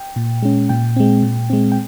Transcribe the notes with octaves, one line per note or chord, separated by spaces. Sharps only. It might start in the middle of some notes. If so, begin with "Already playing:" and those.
Already playing: G5
A#2
G#3 C#4
A#2 G5
G#3 C4
A#2
G#3 C4
G5